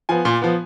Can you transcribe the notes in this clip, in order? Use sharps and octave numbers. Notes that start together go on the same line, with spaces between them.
F3 B3 G#5
A#2
F3 B3